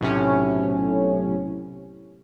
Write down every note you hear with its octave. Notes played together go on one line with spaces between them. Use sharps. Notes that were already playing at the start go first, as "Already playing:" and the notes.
B1 A2 C3 C#4